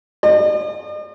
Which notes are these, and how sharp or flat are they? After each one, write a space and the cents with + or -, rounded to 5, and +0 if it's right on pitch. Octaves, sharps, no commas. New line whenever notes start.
D#5 -45